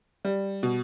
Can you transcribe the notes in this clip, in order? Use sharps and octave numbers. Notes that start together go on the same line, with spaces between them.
G3
B2